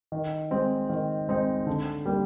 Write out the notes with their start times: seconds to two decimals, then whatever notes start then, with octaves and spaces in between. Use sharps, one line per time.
0.12 D#3
0.51 G#3 C4 D#4
0.89 D#3
1.29 G#3 C4 D#4
1.67 D3
2.05 G3 A#3